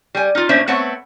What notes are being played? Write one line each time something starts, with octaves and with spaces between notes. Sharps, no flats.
G3 G#5
D#4 F4
B2 A#3 C#4 D4 C5 E5
A3 B3 C4 C#5 F#5